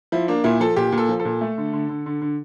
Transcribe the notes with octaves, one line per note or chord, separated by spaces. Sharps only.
F3 E4
A#3 D4
A#2 E4
F3 A4
A#2 G4
A#2
A4
F3
A4
A#2
A3
D3
D3
D3
D3
D3